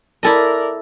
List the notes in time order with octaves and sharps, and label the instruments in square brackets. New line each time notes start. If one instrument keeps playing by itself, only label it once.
[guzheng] E4 A4 D#5 [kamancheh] A#4 D5